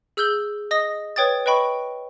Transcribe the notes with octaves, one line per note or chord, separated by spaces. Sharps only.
G#4 E6 F6 G6 F#7 G7
D#5 D#6 A#6 G7
B4 C#5 G5 D#6 A6
B4 D#5 G5 B5 C#6